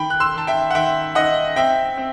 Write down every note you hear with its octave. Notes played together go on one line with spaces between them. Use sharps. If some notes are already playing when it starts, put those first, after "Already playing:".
Already playing: D#3 G5 B5
F#6
C6 E6
D#3 A5
E5 G5
F#5
D#3 E5 G5
D#3 D#5 F#5
C4 E5 G5
C4